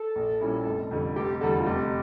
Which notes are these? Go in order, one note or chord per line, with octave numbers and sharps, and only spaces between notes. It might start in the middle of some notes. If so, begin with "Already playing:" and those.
Already playing: A4
A#1
A#2 G3 C#4 E4
F1
F2 D3 G3
F1 G4
E2 D3 G3 A4
F4
F1 G4